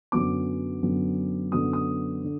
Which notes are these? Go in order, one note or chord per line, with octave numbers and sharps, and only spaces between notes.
F#2 D3 F#3 B3 D6
F#2 D3 F#3 B3
F#2 D3 F#3 B3 D#6
D#6
D3